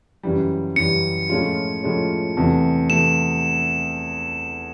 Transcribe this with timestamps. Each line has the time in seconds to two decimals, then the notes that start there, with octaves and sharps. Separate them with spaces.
0.23 F#2 C#3 E3 G3
0.76 F#2 C#3 E3 G3 C#7
1.30 A2 F3 G#3 C#4 F4
1.83 A2 F3 G#3 C#4 F4
2.37 E2 C3 E3 A3
2.90 C3 E3 A3 E7